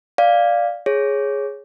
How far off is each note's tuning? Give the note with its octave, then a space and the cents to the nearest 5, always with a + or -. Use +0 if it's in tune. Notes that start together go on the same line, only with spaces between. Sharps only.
D5 +0 F5 +0
G#4 +0 C#5 -5